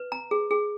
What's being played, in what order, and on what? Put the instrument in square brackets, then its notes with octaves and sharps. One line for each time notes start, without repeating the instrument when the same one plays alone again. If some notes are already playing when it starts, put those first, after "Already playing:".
Already playing: [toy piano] B4
A#5
G#4
G#4